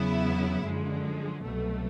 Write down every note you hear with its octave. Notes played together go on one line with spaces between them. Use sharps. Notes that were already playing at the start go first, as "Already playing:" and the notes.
Already playing: E2 C#3 F#3 B3 E4
F#2 D3 F3 G#3
C2 B2 F#3 A3